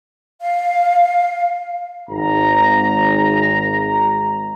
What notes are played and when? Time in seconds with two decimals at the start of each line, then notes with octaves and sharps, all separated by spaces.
0.41 F5
2.10 G#1 A#5